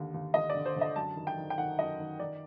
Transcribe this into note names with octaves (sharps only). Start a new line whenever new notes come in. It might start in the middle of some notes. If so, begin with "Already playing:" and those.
Already playing: D#2 D3
D#2
D#2 D#5
D3 D5
C5
D3
D#5
F#2 A5
D#3
G5
D#3
G5
D#3 F#5
F#2 D#5
D#3
D#3 D5